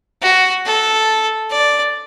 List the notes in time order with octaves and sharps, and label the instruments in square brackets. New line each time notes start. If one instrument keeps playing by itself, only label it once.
[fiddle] F#4
A4
D5